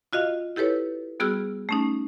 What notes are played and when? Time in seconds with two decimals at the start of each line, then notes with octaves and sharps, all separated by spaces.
0.13 F4 F#4 D#5 F5
0.56 E4 G4 A4 B4 C#5
1.20 G3 B3 F#4 G#4 E6 F6
1.69 A3 C#4 D#4